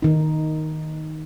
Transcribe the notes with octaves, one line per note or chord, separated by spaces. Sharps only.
D#3 D#4